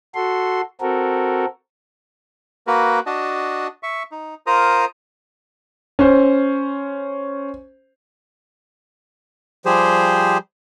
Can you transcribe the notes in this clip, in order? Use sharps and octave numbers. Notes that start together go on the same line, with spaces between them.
F#4 A4 C6
C4 F#4 A4 A#4
A#3 F#4 A#4 B4
D4 F#4 D#5 A5
E5 C#6
D#4
F4 A#4 C5 A#5 D#6
C#4 C5
F3 G3 G4 G#4 C5